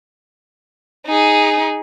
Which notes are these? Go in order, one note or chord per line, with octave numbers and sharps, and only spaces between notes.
D#4 G#4